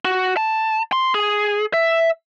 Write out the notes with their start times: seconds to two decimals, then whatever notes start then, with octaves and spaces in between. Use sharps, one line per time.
0.05 F#4
0.37 A5
0.92 C6
1.15 G#4
1.74 E5